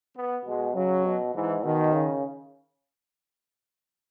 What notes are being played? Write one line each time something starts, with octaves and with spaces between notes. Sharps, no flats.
B3
B2 G#3
C#3 F#3
B2
G#2 E3
B2 D#3
C#3